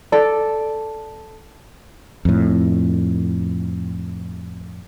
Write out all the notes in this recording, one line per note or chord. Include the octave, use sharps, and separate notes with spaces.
A4 D5
F2 A2